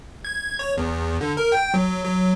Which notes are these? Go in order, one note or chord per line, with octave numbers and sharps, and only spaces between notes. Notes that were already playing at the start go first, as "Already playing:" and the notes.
G#6
C#5
E2
D3
A#4
G5
F#3
F#3